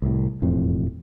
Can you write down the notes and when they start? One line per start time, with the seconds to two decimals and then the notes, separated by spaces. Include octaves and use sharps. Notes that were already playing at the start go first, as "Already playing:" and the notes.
0.02 C2 A2
0.42 E1 F2 A2 C4